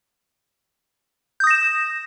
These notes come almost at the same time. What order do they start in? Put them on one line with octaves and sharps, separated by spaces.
G6 D#6 A#6 E7